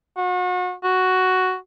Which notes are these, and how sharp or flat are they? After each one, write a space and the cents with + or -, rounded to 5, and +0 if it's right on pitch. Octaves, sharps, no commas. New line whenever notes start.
F#4 -35
F#4 +5